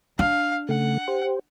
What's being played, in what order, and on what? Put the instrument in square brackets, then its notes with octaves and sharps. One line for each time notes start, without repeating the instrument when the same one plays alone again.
[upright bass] D4 [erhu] F5
[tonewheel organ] C#3 A3 [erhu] F#5
[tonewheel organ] G4 C5